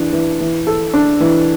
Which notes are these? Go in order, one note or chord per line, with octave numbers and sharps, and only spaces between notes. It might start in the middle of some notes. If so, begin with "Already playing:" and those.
Already playing: E3 D4
E3
E3
A4
D4
E3